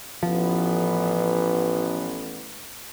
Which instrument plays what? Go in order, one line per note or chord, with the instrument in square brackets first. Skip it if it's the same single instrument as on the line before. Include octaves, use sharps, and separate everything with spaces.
[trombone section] A1 B3 [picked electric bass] F3